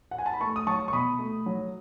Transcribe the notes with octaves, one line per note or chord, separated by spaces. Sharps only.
F#5
G#5
A5
B5
A3 A5 C#6
D#6
F#3 A5 C#6
C#6
B2 B5 D#6
A3
F#3